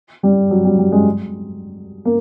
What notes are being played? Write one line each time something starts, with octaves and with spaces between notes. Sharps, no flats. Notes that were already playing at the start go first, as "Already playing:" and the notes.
G3
F#3
G3
G3
G#3
A#3